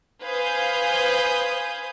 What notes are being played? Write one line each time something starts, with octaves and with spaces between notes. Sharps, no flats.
B4 C5 F5 G#5 D#6 G6